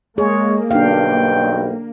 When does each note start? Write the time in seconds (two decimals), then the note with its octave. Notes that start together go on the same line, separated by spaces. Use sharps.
0.18 G#3 A#3 G#4 C#5
0.71 B1 G2 D4 F5 G5